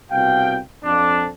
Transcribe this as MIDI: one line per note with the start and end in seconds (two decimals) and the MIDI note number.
0.12 0.58 36
0.12 0.58 47
0.12 0.58 77
0.12 0.58 79
0.85 1.28 41
0.85 1.28 62